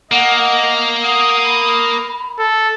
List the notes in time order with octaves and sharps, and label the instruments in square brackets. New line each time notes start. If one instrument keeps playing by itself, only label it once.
[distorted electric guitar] A#3 [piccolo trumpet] D#5 [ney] F#5
[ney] F#5 [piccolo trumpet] D#6
[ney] B5
[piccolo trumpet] A4